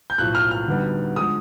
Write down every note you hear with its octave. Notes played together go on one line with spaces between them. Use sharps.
G6
B1 A2 F3 F#6
F6
F6
D2 D3 G3 B3 D#4
D3 F3 G#3 D#6